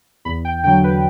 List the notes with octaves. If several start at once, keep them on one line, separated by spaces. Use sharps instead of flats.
E2 B5
G5
D3 F#3 G5
B4